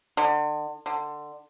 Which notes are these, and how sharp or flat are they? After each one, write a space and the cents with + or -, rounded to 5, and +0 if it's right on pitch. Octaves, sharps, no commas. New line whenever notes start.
D3 +35
D3 +20